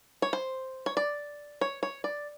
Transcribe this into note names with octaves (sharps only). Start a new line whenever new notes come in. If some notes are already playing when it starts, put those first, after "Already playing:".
C#5
C5
C#5
D5
C#5
C#5
D5